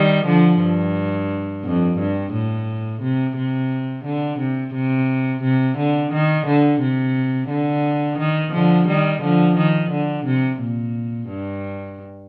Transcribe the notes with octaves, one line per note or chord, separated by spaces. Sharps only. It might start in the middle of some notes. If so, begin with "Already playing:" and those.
Already playing: D#3 G3
D3 F3
G2
F2
G2
A2
C3
C3
D3
C3
C3
C3
D3
D#3
D3
C3
D3
D#3
D3 F3
D#3 G3
D3 F3
D#3
D3
C3
A#2
G2